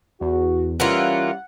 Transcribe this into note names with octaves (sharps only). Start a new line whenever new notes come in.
E2 F#4
E3 G3 A#3 C#4 F4 F#5